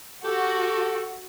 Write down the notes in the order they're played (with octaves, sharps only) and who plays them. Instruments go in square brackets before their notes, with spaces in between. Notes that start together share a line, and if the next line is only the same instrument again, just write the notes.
[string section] F#4 [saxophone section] G4 A4